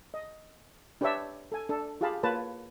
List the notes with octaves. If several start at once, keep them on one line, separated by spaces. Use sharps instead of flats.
D#5
D4 G4 B4 C#5 D5 E5
A4 G#5
D4 A4
F4 G4 G#4 F5 A5 B5
A#3 F4 B4 C#5 A5